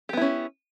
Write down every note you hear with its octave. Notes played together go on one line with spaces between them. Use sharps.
B3 C#4 E4 G4